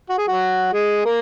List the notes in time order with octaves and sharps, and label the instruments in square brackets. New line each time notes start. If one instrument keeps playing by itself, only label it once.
[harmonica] F#4
G#4
F#3 F#4
G#3 G#4
A#3 A#4